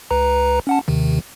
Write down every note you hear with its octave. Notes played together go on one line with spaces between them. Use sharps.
C#2 B4 A#5
C#4 F#5 A5
D#2 C3 D#3